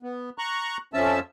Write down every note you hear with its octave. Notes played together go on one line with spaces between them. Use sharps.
B3
A#5 C#6 F#6
F2 F3 C#4 E5 A5 E6